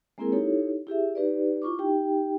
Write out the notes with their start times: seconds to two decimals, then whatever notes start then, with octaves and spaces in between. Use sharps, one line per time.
0.18 G#3 A#3 C4 E4 G#4 A#4
0.32 D#4 E4 G4 A4 C#5
0.87 E4 G4 G#4 E5
1.15 D#4 G4 B4 D5
1.62 E4 F4 C#6 D6
1.79 D#4 G4 G5